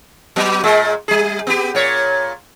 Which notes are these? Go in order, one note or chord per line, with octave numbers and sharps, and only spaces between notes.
F#3 B3
A#2 G#3
G3 G#4
B3 G4
A#2 C#5